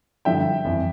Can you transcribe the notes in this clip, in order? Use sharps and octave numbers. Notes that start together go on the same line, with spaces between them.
G2 D3 F3 E5 G5
F2 E3